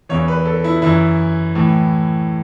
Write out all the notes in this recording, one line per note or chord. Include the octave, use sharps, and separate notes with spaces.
E2 E3 C#5
B4
A4
E4
F#2 E3 E4
A2 E3